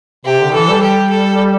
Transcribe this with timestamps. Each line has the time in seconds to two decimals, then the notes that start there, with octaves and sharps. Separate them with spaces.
0.25 C3 G4
0.39 D3
0.53 E3 A4
0.68 G3
0.82 G4
1.10 A4